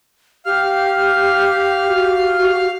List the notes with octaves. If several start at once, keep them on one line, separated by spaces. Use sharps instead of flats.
G4 F5 F6
F#4